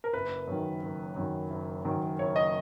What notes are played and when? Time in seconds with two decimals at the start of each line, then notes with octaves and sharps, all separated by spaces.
0.04 A#4
0.13 F#1 B4
0.47 F#2 D#3
0.82 F#1
1.16 F#2 D#3
1.50 F#1
1.85 F#2 D#3
2.19 F#1 C#5
2.36 D#5